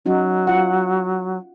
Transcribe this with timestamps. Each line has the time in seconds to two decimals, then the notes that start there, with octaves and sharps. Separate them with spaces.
0.06 F#3 C#4 D#4 F#4
0.47 F4 F#5